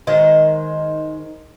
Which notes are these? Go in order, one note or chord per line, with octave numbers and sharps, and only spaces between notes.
D#3 G#3 C5